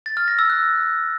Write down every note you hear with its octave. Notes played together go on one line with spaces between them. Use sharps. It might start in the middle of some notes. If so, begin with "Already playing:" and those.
A6
F6
A#6
E6
F#6